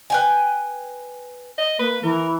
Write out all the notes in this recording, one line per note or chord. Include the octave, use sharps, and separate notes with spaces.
B4 G5 G#5
D#5
A#3 B4
E3 A#4